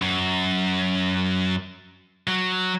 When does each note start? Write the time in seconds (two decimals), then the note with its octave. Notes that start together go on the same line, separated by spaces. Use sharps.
0.02 F#2
2.28 F#3